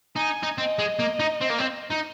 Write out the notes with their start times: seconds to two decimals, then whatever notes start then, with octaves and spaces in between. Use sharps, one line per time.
0.16 D#4 G#5
0.43 D#4
0.58 C4 D#5
0.79 G#3
0.99 A#3
1.20 D#4
1.41 C4
1.50 A#3
1.58 C4
1.90 D#4